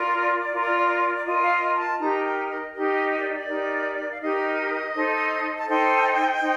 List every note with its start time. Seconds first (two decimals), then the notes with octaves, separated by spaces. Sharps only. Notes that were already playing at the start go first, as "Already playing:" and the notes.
Already playing: F4 A#4 D5
0.52 F4 A#4
1.15 D5
1.25 F4 A#4 D#5
1.41 F5
1.50 D#5
1.75 A5
1.99 D#4 G4 A#4 A#5
2.24 G5
2.49 D#5
2.73 D#4 G4 A#4 D#5
3.10 D#5
3.18 D5
3.34 D5
3.46 D#4 G4 A#4
4.09 F5
4.20 D#4 G4 A#4 D#5
4.94 D#4 A4 C5
5.57 A5
5.68 D#4 A4 C5 G5
6.40 D#4 C5